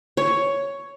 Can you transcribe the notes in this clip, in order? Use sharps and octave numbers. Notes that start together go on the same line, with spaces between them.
C#5